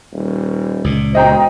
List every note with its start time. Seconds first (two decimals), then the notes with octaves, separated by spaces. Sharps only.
0.12 D#1
0.84 C#2 A#2
1.15 E1 C5 D#5 G5 A#5